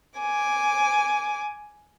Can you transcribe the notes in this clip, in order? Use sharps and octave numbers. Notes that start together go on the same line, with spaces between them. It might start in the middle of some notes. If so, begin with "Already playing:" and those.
G#5 D6